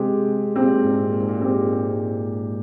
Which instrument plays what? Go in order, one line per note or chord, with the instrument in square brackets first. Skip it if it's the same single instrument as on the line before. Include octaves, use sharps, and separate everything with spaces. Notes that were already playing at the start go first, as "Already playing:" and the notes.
Already playing: [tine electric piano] C3 [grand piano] G#3 C4 G4
[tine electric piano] A#2 [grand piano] G#3 C4 G4
[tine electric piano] A#2
G#2
A#2
G#2
A#2
[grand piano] G#3 C4 G4